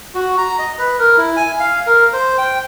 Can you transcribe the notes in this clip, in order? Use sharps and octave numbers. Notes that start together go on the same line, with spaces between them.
F#4
A#5
D#5
B4
A#4
E4
G#5
F5
A#4
C5
G5